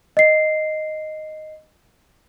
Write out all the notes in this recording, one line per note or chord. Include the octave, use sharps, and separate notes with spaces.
D#5 C7